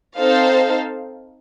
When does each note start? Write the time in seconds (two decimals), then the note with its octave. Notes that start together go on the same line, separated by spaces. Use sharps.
0.17 C4 D#4 A4 C5 F5